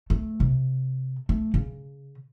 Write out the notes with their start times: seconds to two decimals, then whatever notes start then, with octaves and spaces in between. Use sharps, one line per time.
0.10 A3
0.40 C3
1.29 A3
1.54 C#3